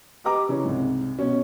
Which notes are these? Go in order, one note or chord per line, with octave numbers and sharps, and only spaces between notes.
G4 B4 D#5 A#5 D6
C#3 E3 C#4
C2 G#2
B2 C#4